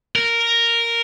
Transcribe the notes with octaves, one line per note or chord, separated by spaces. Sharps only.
A#4